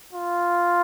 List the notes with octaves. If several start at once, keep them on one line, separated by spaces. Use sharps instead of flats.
F4